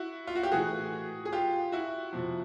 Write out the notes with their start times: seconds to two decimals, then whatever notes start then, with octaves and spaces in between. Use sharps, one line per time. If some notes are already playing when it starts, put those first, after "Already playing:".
Already playing: E4 F#4
0.27 F4
0.35 F#4
0.43 G4
0.52 A2 E3 F#4 G#4
1.25 G#4
1.33 F4 G4
1.72 E4 F#4
2.13 F2 C3 F3